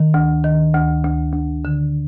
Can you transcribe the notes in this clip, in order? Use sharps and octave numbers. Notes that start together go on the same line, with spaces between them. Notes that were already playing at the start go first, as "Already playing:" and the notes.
Already playing: D#3
D2
D#3
D2
D2
D2
D3